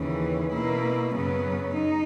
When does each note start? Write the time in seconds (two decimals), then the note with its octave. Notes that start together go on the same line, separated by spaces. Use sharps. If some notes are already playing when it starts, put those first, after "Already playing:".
Already playing: D#2 C#3 E3
0.52 B2 A#3 E4
1.13 F#2 C#3 F#3 B3
1.75 D#4